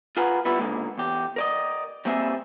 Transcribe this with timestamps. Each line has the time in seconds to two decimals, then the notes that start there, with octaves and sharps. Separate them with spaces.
0.17 F4 G#4 A#4 B4 F#5
0.45 G3 B3 E4 F4
0.59 C#2 G#2 D3 F3 G#3 A#3
0.98 E2 G4
1.36 A#4 D5 D#5
2.05 G3 A#3 C4 G#4 C#5 E5